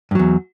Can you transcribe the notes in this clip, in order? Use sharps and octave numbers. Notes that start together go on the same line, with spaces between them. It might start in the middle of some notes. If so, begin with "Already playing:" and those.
E2 G2 F#3